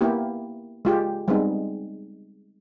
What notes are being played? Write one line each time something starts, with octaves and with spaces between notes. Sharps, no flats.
A#3 B3 E4 G4
G#3 F4 G4
G3 G#3 B3 C4 D#4